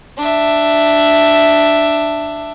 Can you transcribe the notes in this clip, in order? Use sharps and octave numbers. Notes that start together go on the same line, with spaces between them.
D4 E5